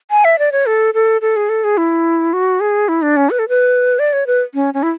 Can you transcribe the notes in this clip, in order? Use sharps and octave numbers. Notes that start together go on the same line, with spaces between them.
G#5
E5
D5
C#5
A4
A4
A4
G#4
A4
G#4
E4
F#4
G#4
E4
D4
C#4
B4
A4
B4
D5
C#5
B4
C#4
C#4
E4